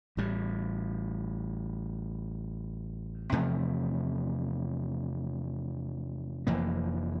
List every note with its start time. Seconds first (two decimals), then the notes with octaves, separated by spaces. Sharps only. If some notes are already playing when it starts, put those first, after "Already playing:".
0.17 A1 A2 G3
3.32 E2 C3 F3 A3
6.47 F1 F2 E3 A#3